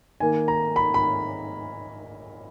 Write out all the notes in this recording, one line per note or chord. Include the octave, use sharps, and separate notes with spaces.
D#3 A#3 G#5
A#5
B5
B5